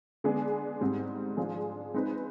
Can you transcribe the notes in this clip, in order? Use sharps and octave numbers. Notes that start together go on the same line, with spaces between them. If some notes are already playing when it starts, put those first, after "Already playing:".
D3 G#3 B3 D4 G#4
G#2 G3 C4
F3 G#3 D4 F4 G#4
G#3 C4 D#4 B4